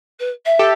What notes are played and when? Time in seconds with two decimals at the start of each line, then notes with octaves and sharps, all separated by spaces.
0.19 B4
0.45 E5
0.59 G4 A4